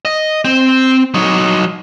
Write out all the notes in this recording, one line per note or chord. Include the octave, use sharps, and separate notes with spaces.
D#5
C4
F#3 D#4